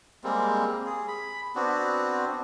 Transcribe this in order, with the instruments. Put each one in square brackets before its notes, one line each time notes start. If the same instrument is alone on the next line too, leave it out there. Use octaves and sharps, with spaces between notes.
[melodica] G3 G#3 A#3 C4
G#4
B5
B3 C4 D4 F#4